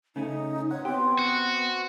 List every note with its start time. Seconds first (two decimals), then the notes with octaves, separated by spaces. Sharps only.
0.16 C#3 A3 C#4 D#4
0.71 C#5 F#5
0.85 B3 C4 G4
1.19 F#4